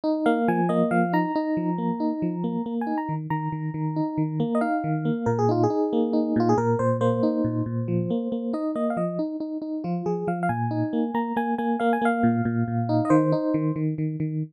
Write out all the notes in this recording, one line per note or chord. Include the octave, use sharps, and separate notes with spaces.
D#4
A#3 F5
F3 G#5
A#3 D#5
F3 F5
D#4 A#5
D#4
F3
A#3
D#4
F3
A#3
A#3
G#5
D#4
A#5
D#3
D#3 A#5
D#3
D#3
D#4
D#3
A#3
D#5
D#4 F5
D#3
A#3
A#2 A#4
G#4
D#4 F4
G#4
D#4
A#3
D#4
A#2 F4
G#4
A#2 A#4
A#2 C5
A#3 C5
D#4
A#2
A#2
F3
A#3
A#3
D#4 D#5
A#3 D#5
F5
F3 D#5
D#4
D#4
D#4
F3 F4
F3 G#4
F3 F5
F5
A#2 G#5
D#4
A#3
A#3 A#5
A#3 G#5
A#3 G#5
A#3 F5
G#5
A#3 F5
A#2
A#2
A#2
D#4
D#5
D#3 C5
D#4
D#3
D#3
D#3
D#3